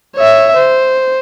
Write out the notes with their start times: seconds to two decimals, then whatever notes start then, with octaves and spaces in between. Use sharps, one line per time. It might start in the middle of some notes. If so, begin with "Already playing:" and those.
0.16 C#5 E5
0.57 C5